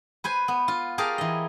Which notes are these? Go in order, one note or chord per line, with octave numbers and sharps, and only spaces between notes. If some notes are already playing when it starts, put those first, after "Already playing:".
B4 C5 G#5
B3
F4
G4 G#4 A#4 F5 A5
E3 D#5